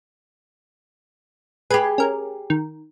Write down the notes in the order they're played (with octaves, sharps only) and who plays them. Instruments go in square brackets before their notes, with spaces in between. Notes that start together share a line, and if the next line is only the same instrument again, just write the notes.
[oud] G4 G#4 [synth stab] B4
[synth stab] C#4 A#4
D#3